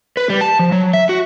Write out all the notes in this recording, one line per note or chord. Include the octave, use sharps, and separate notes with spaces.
B4
G3
A5
F3
F#3
E5
F#4